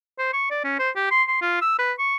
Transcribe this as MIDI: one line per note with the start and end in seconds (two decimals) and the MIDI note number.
0.19 0.33 72
0.33 0.46 85
0.51 0.61 74
0.64 0.77 61
0.79 0.90 72
0.96 1.10 67
1.11 1.23 84
1.28 1.39 84
1.41 1.57 65
1.61 1.77 88
1.79 1.92 71
1.99 2.16 85